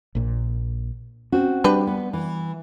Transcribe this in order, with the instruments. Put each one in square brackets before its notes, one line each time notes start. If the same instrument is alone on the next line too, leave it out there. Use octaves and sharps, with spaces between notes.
[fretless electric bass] A#1 A#2
[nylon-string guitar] C4 F#4 [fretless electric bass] C#4
[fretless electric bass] G3 [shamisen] D4 G4 B4
[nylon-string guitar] B3
E3